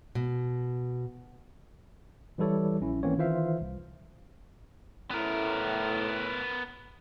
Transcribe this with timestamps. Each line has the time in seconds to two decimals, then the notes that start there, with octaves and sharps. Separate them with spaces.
0.15 B2
2.38 E3 G3 E4 A4 C#5 D5
2.81 A#1 C#4 E4
3.03 G#1 E3 A#3 C4 C#4 C#5
3.18 D#3 E3 F4 C5 E5 F5
3.61 C2
5.11 A2 B3 A#4